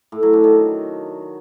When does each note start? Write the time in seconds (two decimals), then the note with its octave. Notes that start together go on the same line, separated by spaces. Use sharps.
0.12 A2
0.23 F#3
0.33 D3
0.44 D#3